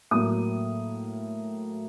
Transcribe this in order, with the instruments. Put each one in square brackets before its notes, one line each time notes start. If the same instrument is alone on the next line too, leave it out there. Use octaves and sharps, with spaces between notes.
[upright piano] A2 F#3 A#3 D#6